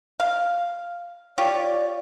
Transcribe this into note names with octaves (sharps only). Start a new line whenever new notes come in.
F5
F4 G4 C#5 D5